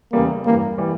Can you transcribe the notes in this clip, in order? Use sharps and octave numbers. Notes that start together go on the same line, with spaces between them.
E2 C#3 E3 G3 A#3
G2 E3 G3 A#3
E3 G3